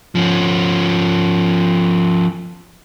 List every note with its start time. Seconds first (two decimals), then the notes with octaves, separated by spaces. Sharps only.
0.15 F3 C#4